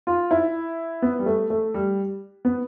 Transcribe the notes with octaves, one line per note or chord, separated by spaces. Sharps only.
F4
E4
B3
G3
A3
A3
G3
B3